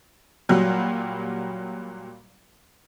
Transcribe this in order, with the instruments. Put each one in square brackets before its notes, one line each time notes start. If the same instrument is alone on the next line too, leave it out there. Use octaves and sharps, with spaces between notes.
[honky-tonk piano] A#2 F#3 G3